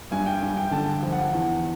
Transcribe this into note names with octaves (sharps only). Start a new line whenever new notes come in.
G2 G#5
G5
G2 G#5
G5
D3 A5
F3
F#5
E2